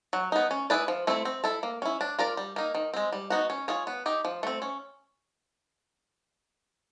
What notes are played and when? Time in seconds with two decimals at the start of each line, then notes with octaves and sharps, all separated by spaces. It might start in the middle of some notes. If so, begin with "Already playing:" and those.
0.13 F#3
0.32 B3 D#4
0.51 C#4
0.70 E4 G#4 B4 D5
0.88 F3
1.07 A3 C4 E4
1.25 C4
1.44 E4 A4
1.63 A#3
1.82 C#4 E4
2.01 D4
2.19 F4 A#4 D5
2.37 G3
2.56 A#3 D#4
2.75 D#3
2.94 G#3 C4
3.12 G3
3.30 B3 D#4 F#4
3.50 C#4
3.68 F4 G#4 C#5
3.87 B3
4.06 D#4 G4
4.25 F3
4.43 A3 C4
4.62 C#4